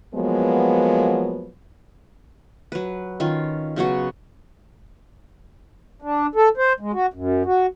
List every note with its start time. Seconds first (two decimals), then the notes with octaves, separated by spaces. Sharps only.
0.15 F3 F#3 G#3 A#3 B3
2.72 F#3 B4
3.20 D#3 C#4 F4
3.76 C#3 F#3 B3 F#4
6.02 D4
6.35 A4
6.57 C5
6.80 G#3
6.93 F#4
7.14 F#2
7.45 F#4